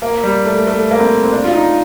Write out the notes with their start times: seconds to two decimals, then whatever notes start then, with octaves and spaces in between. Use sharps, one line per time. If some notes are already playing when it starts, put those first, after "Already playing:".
0.02 A#3
0.24 G3
0.45 A3
0.67 A3
0.91 A#3
0.99 C4
1.24 C4
1.32 D4
1.44 F4
1.54 D#4